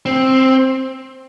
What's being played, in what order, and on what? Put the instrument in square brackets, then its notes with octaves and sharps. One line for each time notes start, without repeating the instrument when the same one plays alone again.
[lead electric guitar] C4